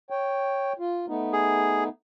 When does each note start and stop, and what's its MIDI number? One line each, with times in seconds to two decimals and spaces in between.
0.10 0.73 73
0.10 0.73 79
0.79 1.06 65
1.08 1.89 57
1.08 1.89 59
1.08 1.89 63
1.33 1.84 68